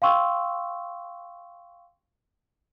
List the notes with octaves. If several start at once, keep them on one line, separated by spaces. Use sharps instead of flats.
F5 G5 C6 C#6 E6